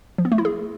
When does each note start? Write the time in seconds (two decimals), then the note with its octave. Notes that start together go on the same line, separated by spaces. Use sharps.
0.18 F3
0.25 B3
0.32 A3
0.38 E4
0.45 G#4